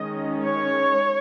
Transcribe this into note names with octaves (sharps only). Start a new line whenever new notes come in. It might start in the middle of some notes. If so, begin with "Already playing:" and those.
Already playing: D#3 G#3 C#4 D#5
C#5